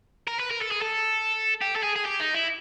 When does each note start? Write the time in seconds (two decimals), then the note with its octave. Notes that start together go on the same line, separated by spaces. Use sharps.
0.28 A#4
0.39 B4
0.51 A#4
0.61 A4
0.71 G#4
0.82 A4
1.61 G4
1.76 A4
1.83 G#4
1.96 G#4
2.05 G4
2.20 D#4
2.34 E4